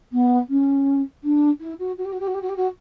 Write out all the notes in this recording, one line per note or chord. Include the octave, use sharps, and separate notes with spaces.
B3
C#4
D4
E4
F#4
F#4
G4
F#4
G4
F#4
G4
F#4
G4
F#4